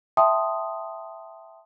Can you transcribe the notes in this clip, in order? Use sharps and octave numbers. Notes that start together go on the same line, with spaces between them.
E5 G5 A5 C6 D#6